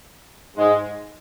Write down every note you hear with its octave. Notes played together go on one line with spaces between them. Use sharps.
G#2 G#3